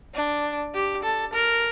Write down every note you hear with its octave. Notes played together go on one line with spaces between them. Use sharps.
D4
G4
A4
A#4